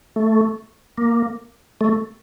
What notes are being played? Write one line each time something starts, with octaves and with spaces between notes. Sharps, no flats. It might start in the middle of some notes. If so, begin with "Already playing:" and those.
A3
A#3
A3